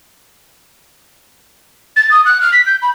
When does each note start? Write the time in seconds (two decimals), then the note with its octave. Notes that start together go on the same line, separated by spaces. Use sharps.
1.96 A6
2.11 D#6
2.25 F#6
2.41 F6
2.52 B6
2.66 G6
2.82 B5